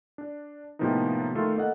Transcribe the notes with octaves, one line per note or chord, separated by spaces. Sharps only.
D4
A2 C3 F3 A#3 B3 D#4
D#3 A3 F4 A4
A#3 A4 D#5 F#5